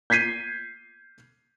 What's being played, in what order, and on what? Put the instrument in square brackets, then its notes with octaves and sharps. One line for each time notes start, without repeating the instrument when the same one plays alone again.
[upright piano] G6 G#6 B6 C7 D#7